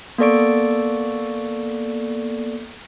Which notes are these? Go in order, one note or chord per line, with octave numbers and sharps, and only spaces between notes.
A#3 B3 A4 D5 C#6 D7